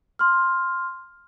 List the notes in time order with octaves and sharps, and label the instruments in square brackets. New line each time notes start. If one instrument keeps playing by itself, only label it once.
[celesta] C6 F6